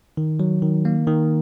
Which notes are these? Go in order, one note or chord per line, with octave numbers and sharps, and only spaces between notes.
D#3
F#3
D#3
A#3
D#3